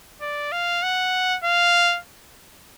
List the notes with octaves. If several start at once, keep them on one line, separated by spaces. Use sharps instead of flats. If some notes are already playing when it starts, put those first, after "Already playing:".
D5
F5
F#5
F5